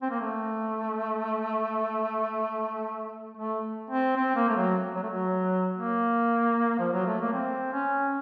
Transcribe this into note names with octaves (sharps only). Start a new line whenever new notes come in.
C4
A#3
A3
A3
C4
C4
A#3
A3
F#3
F#3
A3
F#3
A#3
F3
F#3
A3
A#3
C4
C#4